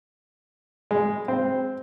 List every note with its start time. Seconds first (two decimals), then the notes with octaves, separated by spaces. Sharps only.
0.91 G#3
1.28 C4